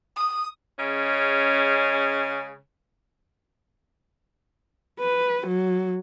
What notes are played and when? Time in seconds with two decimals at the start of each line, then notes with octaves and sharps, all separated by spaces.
0.17 D#6
0.78 C#3 G#3 C#4
4.99 B4
5.47 F#3